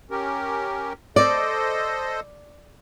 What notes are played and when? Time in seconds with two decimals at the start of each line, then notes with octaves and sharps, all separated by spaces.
0.11 C#4 G4 A#4
1.16 A4 C5 D5 D#5